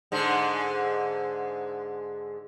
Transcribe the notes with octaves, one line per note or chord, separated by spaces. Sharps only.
G#2 D3 G#3